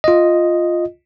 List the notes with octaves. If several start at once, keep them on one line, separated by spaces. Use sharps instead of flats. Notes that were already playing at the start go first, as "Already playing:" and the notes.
F4 D#5